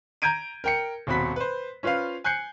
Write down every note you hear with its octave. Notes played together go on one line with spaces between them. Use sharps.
A#5 G6 G#6 D7 D#7
A#4 G5 C#7
D#1 B2 C4 F#4 B5 B6
B4 C5
C#4 F4 B4 C5 F5
G#5 F#6 G6 C7 C#7